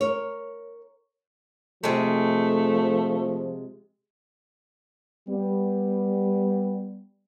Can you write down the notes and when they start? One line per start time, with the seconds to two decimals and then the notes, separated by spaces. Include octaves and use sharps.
0.01 A#4 C#5
1.84 C3 F3 G#3 A3
5.28 G3 B3